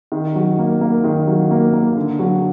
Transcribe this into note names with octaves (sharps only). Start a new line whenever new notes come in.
D#3
F#3
A#3
A#3
D#3
F#3
A#3
A#3
D3
F#3